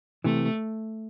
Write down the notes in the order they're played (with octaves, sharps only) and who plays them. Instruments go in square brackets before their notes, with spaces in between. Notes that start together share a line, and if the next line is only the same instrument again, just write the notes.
[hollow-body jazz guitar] C3 E3 [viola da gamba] A3